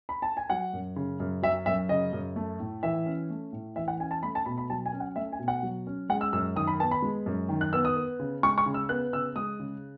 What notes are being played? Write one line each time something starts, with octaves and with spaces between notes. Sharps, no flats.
B5
A5
G#5
F#3 F#5
F#2
C#3
F#2
F#3 E5
F#2 E5
C#3 D#5
F#2
A3
A2
E3 E5
C#4
A3
A2
E3 E5
F#5
C#4 G#5
A5
A3 B5
A5
B2 B5
B5
F#3 A5
G#5
C#4
F#5
A3 E5
G#5
B2
F#5
F#3
C#4
G#3 F#5
E6
F#2 E6
D#3 D#6
B5
B3 A5
B5
G#3
F#2
D#3
F#6
B3 E6
D#6
B3
C#3
G#3 C#6
C#6
C#3
E6
B3 F#6
C#3 E6
G#3 D#6
C#3